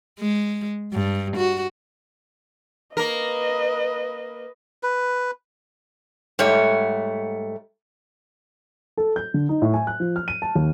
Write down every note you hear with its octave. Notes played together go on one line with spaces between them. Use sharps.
G#3
G2
F#4
A#3 A#4 B4 D#5
B4
G#2 G3 A3 C#5
A4
G6
D3
D#4
A2
G#5
F#6
F3
F6
D#7
A5
D#2